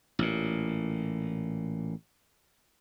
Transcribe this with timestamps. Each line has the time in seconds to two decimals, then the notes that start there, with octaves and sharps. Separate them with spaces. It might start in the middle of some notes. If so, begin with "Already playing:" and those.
0.19 A1 A#2